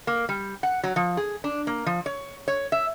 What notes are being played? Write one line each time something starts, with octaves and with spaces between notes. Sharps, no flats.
A#3
G3
F#5
F#3
F3
G#4
D4
A#3
F3
C#5
C#5
E5